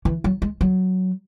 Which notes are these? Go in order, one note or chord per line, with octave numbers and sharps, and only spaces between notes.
E3
F#3
G#3
F#3